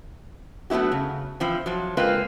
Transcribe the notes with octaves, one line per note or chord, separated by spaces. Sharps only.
F#3 A3 B3 E4 F#4
C#3
E3 F3 C4
F3 F#3
G#3 A#3 C4 F4 B4